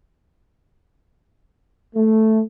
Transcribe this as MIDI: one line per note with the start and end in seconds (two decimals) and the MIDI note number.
1.96 2.41 57